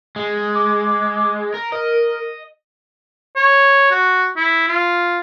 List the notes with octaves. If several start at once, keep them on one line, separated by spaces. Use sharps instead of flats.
G#3
D6
A#4
A#4 D#5
C#5
F#4
E4
F4